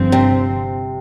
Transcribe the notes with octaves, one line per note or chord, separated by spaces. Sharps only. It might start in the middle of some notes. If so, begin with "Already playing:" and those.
Already playing: G1 G2 F3 C4
C3